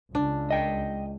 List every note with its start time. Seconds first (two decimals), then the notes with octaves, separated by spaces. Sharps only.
0.15 C#2 D4
0.51 D#5 G5